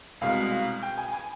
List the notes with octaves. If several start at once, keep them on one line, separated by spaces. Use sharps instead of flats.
C2 B2 G#3 F5
G5
G#5
G#5